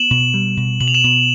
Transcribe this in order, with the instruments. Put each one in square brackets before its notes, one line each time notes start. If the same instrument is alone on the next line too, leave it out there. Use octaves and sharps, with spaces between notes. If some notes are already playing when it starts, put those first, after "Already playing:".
Already playing: [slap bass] B3 [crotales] E7 F#7
[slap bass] B2
G3
B2
[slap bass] B2 [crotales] F#7
[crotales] F7
E7 F#7
[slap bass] B2